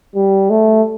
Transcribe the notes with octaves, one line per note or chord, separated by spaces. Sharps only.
G3
A3